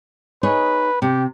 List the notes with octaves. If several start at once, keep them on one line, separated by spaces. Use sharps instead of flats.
D#4 G#4 B4 C#5
C3 G4